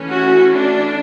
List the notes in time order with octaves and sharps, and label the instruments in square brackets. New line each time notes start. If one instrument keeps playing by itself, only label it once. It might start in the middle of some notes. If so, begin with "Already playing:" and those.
Already playing: [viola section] E3 A3 C#4
F#4
D4